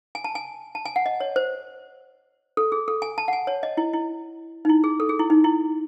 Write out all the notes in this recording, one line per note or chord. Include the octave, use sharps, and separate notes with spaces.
G#5
A5
G#5
A5
G#5
F#5
D#5
C#5
C5
A4
G#4
A4
G#5
A5
F#5
G#5
C#5
D#5
E4
E4
D#4
E4
G#4
A4
G#4
E4
D#4
E4